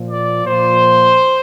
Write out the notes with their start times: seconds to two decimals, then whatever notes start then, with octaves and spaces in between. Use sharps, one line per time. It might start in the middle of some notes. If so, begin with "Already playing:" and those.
Already playing: A#2 F3
0.10 D5
0.46 A#2 F3 C5